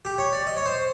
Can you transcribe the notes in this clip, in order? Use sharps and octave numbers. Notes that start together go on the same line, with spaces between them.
G4
C#5
D5
D#5
C#5
C5